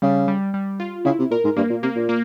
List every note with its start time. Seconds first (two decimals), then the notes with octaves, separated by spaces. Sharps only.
0.02 C#3 G3
0.28 G3
0.54 G3
0.80 F4
1.05 C#3 E4
1.19 C3
1.31 A#2 A#4
1.44 G#2
1.57 G2 A#3
1.70 A#2
1.83 C3 A#3
1.95 A#2
2.09 A#3